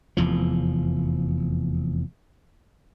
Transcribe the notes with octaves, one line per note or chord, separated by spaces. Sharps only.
F1 E2 F3